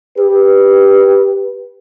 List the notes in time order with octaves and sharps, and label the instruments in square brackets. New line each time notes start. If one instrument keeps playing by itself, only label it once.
[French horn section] G4 B4